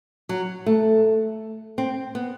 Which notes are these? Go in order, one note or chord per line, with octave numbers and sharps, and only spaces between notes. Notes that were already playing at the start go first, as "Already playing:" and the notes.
F#3
A3
C4
B3